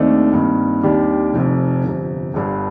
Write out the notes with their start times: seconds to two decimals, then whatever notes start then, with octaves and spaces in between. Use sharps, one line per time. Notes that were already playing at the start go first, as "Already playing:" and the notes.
Already playing: D#2 D#3 A3 C4 D4 D#4
0.32 G2 D#3 A#3
0.83 D#2 D#3 G3 D4 G4
1.34 F1 F2 C3
1.83 G1 F2 C3
2.34 G1 G2 D3 G3